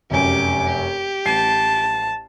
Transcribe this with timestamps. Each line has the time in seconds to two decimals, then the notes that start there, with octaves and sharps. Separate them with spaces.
0.11 F1 F#2 G4 D6
0.66 G4
1.26 A1 A5 C7